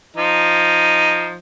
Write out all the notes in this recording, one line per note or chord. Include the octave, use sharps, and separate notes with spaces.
F3 D#4